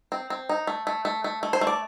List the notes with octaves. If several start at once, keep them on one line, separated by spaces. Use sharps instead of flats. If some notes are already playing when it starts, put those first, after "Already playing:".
C4
C4
D#4
A3
A3
A3
A3
A3
C5
A3
D5